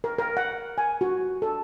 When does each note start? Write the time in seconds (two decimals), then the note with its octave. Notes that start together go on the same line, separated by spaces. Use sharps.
0.04 A#4
0.18 A#4
0.37 F#5
0.78 G#5
1.01 F#4
1.42 A4